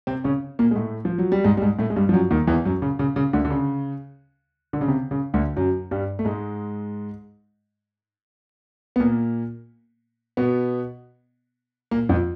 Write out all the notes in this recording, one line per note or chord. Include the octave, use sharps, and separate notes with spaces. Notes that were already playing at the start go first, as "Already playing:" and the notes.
C3 C4
C#3 C#4
A#2 A#3
G#3
A2 A3
F3
F#3
G3
G#2 G#3
G3
G#2 G#3
A2 A3
G#3
G2 G3
F3
F#2 F#3
D#2 D#3
E2 E3
F#2 F#3
C#3
C#3
C#3
D2 D3
D3
C#3
D3
C#3
C3
C#3
D2 D3
F#2 F#3
G2 G3
A3
G#2 G#3
B3
A#2 A#3
B2 B3
A#2 A#3
F2 F3